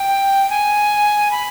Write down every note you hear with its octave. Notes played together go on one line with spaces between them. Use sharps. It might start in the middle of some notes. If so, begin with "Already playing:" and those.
Already playing: G5
G#5
B5